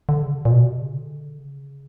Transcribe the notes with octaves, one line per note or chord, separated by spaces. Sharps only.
D3
C#3
C3
A#2
B2
C3
C#3
D3
C#3